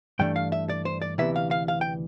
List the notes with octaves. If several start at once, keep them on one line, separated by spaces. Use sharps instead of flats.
G2 E3 A3 D4 G5
F5
E5
D5
C5
D5
D2 C3 E3 B3 E5
F5
F5
F5
G5